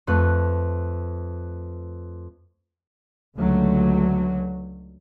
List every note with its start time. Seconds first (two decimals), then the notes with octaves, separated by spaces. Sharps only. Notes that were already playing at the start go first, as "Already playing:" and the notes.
0.07 F2 A3 B4 F#6
3.37 C#2 D3 F#3 A3